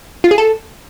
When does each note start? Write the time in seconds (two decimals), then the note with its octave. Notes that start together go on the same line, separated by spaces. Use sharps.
0.24 F4
0.31 G#4
0.38 A4